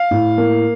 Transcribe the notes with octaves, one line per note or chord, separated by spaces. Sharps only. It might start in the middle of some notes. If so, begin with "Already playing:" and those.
Already playing: F5
A2
A#3